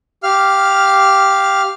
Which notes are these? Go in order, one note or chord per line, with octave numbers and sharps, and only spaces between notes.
G4 F5 F6